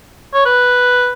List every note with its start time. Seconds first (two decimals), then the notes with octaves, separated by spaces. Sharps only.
0.33 C#5
0.45 B4